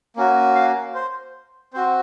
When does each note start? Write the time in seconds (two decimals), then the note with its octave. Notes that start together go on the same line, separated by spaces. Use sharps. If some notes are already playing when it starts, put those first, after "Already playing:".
0.16 A#3 C#4 F#4
0.55 F5
0.94 C5
1.73 C4 F#4 C5